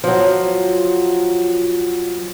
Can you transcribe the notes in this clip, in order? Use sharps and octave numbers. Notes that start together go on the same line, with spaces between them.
F3 F#3